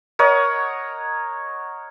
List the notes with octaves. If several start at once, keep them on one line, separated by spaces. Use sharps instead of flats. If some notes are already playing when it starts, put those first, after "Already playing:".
A#4 C#5 D#5 F#5